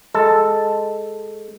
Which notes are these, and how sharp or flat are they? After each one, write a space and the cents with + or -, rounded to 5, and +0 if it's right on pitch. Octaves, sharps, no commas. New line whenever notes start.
G#3 +0 A4 +0